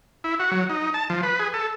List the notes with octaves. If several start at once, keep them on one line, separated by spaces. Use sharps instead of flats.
E4
F#4
F#3
D#4
A5
F3
B4
G#4
A4